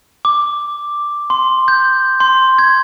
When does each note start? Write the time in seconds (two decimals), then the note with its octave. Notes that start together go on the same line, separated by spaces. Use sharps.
0.25 D6
1.30 C6
1.68 G6
2.20 C6
2.58 G#6